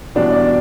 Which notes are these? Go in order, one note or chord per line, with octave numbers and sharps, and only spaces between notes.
E2 B2 G3 D4
D5